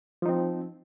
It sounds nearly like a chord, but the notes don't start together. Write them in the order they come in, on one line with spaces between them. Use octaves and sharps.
F3 D#4 C4